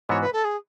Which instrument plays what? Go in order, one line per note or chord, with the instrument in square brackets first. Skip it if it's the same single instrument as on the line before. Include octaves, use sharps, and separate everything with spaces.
[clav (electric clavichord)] G#2 E3 B3 F#4 [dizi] C#5
[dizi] B4
A4
G#4